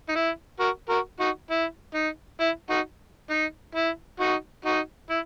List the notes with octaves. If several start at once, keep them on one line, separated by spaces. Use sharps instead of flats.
D#4
E4
F#4 A#4
F#4 A#4
D#4 F#4
E4
D#4
E4
D#4 F#4
D#4
E4
D#4 F#4
D#4 F#4
E4